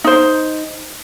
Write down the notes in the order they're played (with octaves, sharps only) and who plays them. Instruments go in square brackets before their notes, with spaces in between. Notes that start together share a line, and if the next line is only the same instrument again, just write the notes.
[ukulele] D#4 C5